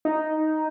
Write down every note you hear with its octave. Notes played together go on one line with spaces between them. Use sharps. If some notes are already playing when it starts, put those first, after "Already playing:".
D#4